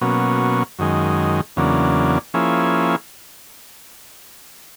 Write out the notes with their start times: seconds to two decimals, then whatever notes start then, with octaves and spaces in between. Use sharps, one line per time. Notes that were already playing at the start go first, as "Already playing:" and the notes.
0.01 B2 F#3 A#3 C#4
0.79 F#2 D#3 G#3
1.56 E2 C#3 F#3 A#3 D4
2.34 F3 A#3 C#4 E4 G#4